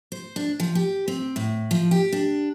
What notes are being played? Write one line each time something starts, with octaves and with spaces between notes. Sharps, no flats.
C5
D4
F3
G4
C4
A2
F3
G4
D4